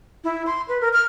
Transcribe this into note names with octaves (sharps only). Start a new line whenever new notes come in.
E4
C6
B4
A#4
F6